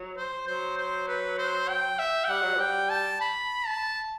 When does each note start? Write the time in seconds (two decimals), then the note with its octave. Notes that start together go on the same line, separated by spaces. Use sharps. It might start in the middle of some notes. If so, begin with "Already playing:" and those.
Already playing: F#3
0.17 C5
0.47 F#3 C5
0.77 C5
1.08 B4
1.38 C5
1.69 G5
1.99 E5
2.25 G5
2.29 G3 F#5
2.43 F#3
2.56 G3 G5
2.90 A5
3.21 B5
3.66 A5